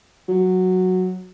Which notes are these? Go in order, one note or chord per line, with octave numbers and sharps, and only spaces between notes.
F#3